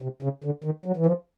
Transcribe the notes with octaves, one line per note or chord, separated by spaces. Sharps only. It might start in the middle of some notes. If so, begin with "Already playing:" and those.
C3
C#3
D3
D#3
F#3
E3
F3